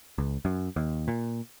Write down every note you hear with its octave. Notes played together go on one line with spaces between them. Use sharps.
C#2
F#2
D#2
A#2